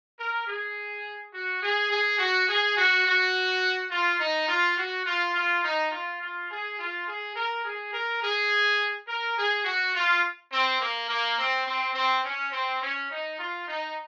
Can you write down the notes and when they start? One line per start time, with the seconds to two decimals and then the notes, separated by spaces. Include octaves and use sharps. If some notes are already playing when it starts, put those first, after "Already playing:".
0.18 A#4
0.46 G#4
1.32 F#4
1.61 G#4
1.90 G#4
2.18 F#4
2.47 G#4
2.76 F#4
3.05 F#4
3.90 F4
4.19 D#4
4.47 F4
4.77 F#4
5.05 F4
5.33 F4
5.63 D#4
5.91 F4
6.20 F4
6.49 G#4
6.78 F4
7.06 G#4
7.34 A#4
7.64 G#4
7.93 A#4
8.22 G#4
9.07 A#4
9.36 G#4
9.64 F#4
9.94 F4
10.51 C4
10.80 A#3
11.08 A#3
11.37 C4
11.65 C4
11.93 C4
12.23 C#4
12.52 C4
12.80 C#4
13.09 D#4
13.38 F4
13.66 D#4